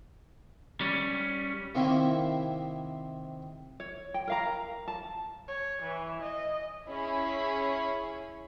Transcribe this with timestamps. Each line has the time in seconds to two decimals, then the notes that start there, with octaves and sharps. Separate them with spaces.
0.81 G3 C#4
1.75 C3 D#3 A#3 C4 E4
3.80 C#5
4.14 G5
4.28 A#4 F5 A#5
4.88 A5
5.48 C#5
5.82 E3
6.21 D#5
6.88 C#4 E4 G#4 B5